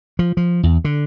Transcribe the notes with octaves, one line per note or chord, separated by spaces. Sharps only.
F3
F3
E2
D3